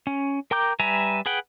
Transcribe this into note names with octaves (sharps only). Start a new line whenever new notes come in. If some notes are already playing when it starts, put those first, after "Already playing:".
C#4
A#4 G5 A#5 D6 G6
G3 B4 E5 G#5 A#5
G#4 B4 F#5 G5